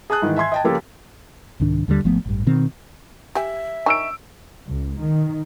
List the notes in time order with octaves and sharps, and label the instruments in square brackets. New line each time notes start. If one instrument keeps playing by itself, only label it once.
[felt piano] G#4 G#5 A5 D#6 F#6
G#2 D#3 E3
E5 G#5 C6 G#6
D#5 G5 A5
C#3 F3 A#3 F4 G4 A4
[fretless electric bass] C2 G#2 D#3 D4
D#2 D3 D#3 G3
G#1 F3 A3 B3
A1 G2
B2 D#3 C4
[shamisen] G4 G#5 [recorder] E5
[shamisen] D#3 D#4 G#5 [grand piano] C#6 E6 D7
[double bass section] C#2
D#3